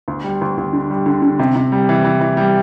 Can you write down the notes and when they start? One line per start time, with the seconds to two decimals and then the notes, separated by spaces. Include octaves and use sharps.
0.08 D2
0.24 G3
0.41 D2
0.57 D2
0.73 D3
0.90 G3
1.06 D3
1.22 D3
1.39 C3
1.56 C3
1.72 G3
1.89 E3
2.05 E3
2.21 E3
2.37 G3